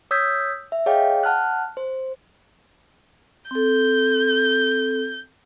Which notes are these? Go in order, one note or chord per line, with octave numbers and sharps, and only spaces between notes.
C#5 D#6 E6 G6 G#6 B6
E5
G#4 C#5 D#5 F5 G5
F#5 A5 F6 F#6
C5
C4 A4 G6